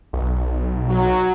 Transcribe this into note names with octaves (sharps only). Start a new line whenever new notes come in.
B1
F#3